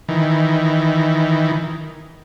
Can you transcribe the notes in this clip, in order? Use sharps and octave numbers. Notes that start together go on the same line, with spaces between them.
D#3 E3